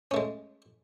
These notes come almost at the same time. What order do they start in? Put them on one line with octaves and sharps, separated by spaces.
C#4 A3 G#3